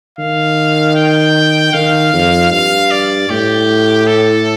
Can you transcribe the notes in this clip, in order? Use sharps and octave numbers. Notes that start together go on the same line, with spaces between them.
D#3 F5
G5
D#3 F5
F2
G2 F5
D5
A2 G4
A4